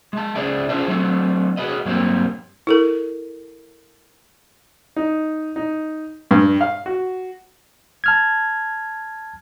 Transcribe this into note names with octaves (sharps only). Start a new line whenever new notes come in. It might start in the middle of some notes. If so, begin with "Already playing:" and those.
G#3 A5
C#2 C#4 G#4 C5 D5 E5
C#4 F4 G#4 C5 E5 A5
F#3 A3 C4
F#4 G#4 A4 B4 D#5
G2 F#3 A#3 C4 G4
E4 A4 A#4
D#4
D#4
G2
F5
F#4
A5 F6 G#6